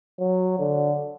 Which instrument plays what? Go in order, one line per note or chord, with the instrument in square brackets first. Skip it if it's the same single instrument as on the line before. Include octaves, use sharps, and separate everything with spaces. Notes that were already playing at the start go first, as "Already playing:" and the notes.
[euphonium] F#3
D3